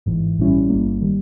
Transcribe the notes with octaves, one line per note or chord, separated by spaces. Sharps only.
G#1 G#2 E3
A#1 A#2 G3 C#4 E4
G1 G2 G3 A#3
D#3 G3